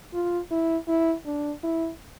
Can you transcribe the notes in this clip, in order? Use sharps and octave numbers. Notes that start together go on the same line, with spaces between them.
F4
E4
E4
D4
E4